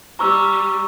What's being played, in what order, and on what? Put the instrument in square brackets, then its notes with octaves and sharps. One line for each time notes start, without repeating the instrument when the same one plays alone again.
[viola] G3 [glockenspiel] A#5 C#6 E6